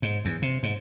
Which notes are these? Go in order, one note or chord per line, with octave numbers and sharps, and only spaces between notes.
G#2
E2
C3
G#2